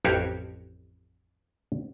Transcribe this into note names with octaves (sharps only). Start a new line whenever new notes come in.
A1 F2 F#4 G4 C#5 F5